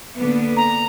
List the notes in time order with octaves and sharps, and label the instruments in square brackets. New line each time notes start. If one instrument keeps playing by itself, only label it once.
[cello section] D3 A#3 B3
[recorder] A#5